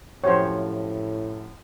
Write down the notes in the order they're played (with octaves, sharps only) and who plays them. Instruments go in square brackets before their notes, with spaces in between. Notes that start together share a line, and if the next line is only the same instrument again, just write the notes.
[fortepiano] F#2 C3 F3 [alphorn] A2 [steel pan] C5 C#5